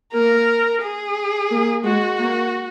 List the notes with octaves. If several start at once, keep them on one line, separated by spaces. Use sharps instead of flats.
A#3 A#4
G#4
A#3
G#3 F#4
A#3